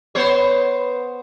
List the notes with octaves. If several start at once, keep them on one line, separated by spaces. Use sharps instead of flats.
B3 C5 C#5